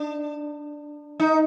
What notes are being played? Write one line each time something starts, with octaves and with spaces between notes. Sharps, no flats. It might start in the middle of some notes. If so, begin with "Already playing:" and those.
Already playing: D4
D#4